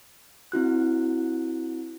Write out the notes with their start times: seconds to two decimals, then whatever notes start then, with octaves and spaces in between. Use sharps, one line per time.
0.52 C4 E4 F#4 F#6